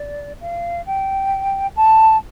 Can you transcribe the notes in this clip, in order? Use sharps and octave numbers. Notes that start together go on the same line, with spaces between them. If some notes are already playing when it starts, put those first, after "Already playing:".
Already playing: D5
F5
G5
A5